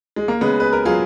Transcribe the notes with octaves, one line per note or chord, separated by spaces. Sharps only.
G#3
A#3
C#3 G#3 B3
B4
A#4
F#3 F4 G#4